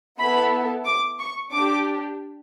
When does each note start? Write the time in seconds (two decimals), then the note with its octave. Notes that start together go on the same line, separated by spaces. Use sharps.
0.19 B3 E4 A4 B5
0.85 D6
1.19 C#6
1.52 D4 G4 D6